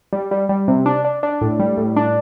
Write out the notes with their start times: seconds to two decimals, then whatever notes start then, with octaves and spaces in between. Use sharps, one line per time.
0.13 G3
0.31 G3
0.49 G3
0.68 C3
0.86 D4
1.05 D4
1.23 D4
1.41 A2
1.59 G3
1.77 A2
1.96 D4